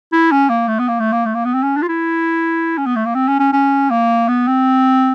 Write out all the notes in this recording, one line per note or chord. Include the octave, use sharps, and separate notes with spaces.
E4
C#4
A#3
A3
B3
A#3
A3
A#3
A3
A#3
B3
C4
C#4
D4
F4
E4
C#4
B3
A3
A#3
C4
C#4
C#4
C#4
A#3
B3
C4